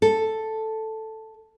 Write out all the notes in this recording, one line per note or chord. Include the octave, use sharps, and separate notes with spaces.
A4